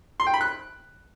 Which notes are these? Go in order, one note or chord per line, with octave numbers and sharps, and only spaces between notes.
C6
G5
B5
F#6